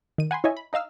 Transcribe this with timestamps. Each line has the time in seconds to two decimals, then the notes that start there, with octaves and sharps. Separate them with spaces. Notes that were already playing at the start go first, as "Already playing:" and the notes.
0.18 D#3 D#7
0.31 F#5 G#5 B5 C6
0.44 E4 C#5 D#5 E5 G#5
0.57 B5
0.73 D#4 D#5 F5 E6 F6